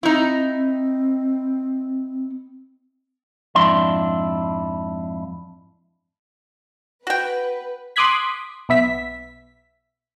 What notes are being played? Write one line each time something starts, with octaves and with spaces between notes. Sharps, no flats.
C4 D#4 E4
F2 G#2 D4 E4 C6
F#4 B4 G5
C6 D6 D#6 F#6 G#6 B6
B1 B3 E5 B6